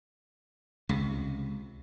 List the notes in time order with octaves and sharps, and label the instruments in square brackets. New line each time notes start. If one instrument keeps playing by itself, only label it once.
[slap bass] C#2 C3